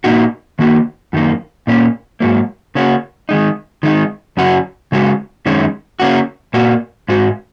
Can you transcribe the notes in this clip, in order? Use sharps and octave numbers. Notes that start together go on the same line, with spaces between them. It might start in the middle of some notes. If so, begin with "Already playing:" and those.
A#2 A#3 D#4 F#4
D#3 A#3 F#4
F#2 D#3 A#3
A#2 A#3 C#4
G#2 F#3 A#3
C#3 A#3 C#4 F#4
D#3 G#3 D#4
D#3 G#3 D#4
F#2 C#3 F#3 C#4 F#4
C#3 G#3 F#4
F#2 D#3 G#3 C#4
C#3 A#3 C#4 F#4
A#2 A#3 F#4
G#2 G#3 F#4